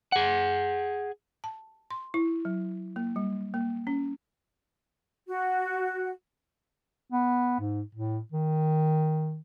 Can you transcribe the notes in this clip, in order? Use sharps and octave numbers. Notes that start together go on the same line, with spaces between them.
G#4 F#5
A5
C6
E4
F#3
A#3
G3
A#3
C#4
F#4
B3
G#2
A2
D#3